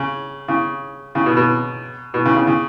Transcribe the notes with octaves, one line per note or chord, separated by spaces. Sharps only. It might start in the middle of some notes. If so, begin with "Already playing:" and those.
Already playing: C#3
C#3
C#3
B2
B2
B2
C#3
C#3
C#3